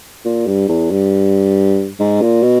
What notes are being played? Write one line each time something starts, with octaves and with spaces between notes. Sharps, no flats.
A#2
G2
E2
G2
G#2
A#2
B2